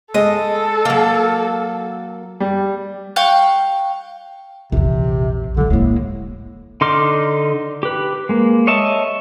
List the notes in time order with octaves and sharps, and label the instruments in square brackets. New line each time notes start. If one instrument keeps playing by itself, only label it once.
[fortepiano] G#3 [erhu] A4 [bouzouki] D#5
[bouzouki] F#3 A#3
[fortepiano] G3
[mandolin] F5 G5 C#6 F#6
[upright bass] A#1 E2 [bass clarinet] C3
[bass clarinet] D3 [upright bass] F#3 G3
[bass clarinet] A2 [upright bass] G#3 A#3
[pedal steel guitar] D3 D#4 C6 D6 F6
G4 B4
G#3 A#3
C#5 D#5 E5 A5